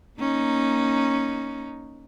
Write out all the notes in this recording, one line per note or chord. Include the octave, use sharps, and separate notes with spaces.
A#3 C#4 D#4